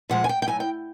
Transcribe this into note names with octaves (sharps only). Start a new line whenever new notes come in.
A#2 F3 G#3 F#5
G#5
G5
G5
A2 F#3 G#5
G5